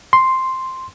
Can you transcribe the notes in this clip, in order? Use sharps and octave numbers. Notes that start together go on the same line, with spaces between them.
C6